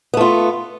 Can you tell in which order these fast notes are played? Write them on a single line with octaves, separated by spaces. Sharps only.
B3 A3 F4